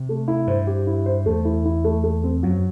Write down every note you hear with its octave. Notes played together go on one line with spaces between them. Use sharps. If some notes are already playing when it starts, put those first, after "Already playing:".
Already playing: C3
A3
E4
G2 C5
G4
E4
C5
E2 A3
E4
E4
A3
A3
C4
F#2 F#3